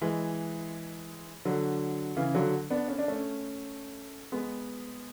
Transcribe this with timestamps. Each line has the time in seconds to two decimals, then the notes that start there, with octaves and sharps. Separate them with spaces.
0.02 E3 G#3
1.45 D3 F#3
2.17 C#3 E3
2.35 D3 F#3
2.70 B3 D4
2.89 C#4
2.99 D4
3.08 A3 C#4
4.32 G#3 B3